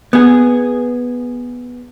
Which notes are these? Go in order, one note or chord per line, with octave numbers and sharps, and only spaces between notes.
B3 G#4